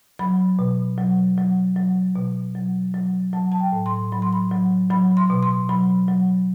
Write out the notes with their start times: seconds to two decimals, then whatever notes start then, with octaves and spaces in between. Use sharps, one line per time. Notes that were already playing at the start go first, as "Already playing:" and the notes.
0.19 F#3 B5
0.59 B2
0.98 F#3
1.38 F#3
1.76 F#3
2.16 B2
2.55 F#3
2.94 F#3
3.33 F#3 A5
3.52 A5
3.60 G5
3.73 A2
3.86 C6
4.12 F#3 B5
4.22 C6
4.33 B5
4.51 F#3
4.90 F#3 B5
5.17 C6
5.30 B2
5.43 C6
5.69 F#3 B5
6.08 F#3